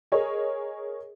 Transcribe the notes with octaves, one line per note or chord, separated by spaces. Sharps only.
G#4 A#4 C#5 D#5